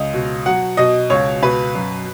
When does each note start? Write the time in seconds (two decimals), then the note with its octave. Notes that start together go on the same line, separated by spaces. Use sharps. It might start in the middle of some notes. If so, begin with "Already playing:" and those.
Already playing: C#2 D#5
0.14 B2
0.46 F#3 F#5
0.77 B2 D#5
1.10 C#2 C#5
1.42 B2 B4
1.75 F#2